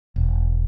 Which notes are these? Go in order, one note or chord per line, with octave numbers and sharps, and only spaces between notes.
E1